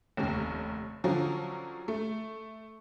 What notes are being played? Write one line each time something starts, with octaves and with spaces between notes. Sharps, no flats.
F1 D#2 C#4
D3 F3 F#3 C#4
A3